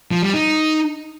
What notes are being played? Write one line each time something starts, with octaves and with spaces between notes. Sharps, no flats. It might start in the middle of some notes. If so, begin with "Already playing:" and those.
F3
G3
D#4